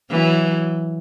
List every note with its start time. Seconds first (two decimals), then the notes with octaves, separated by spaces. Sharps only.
0.10 E3 F#3